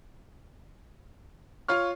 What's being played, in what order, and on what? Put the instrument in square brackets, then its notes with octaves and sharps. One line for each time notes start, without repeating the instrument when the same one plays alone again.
[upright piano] F4 C#5 F6 [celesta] C#6